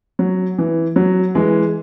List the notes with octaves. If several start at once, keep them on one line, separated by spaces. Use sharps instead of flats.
F#3
E3
F#3
E3 G#3